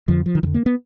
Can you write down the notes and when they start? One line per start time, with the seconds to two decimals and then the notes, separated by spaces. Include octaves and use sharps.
0.08 F2 D3 F3
0.26 F3
0.35 D#3
0.43 F2 D3 E3
0.54 A#3
0.66 B3